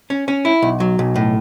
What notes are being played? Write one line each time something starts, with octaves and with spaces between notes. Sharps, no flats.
C#4
C#4
E4
B1
F#3
B1
A2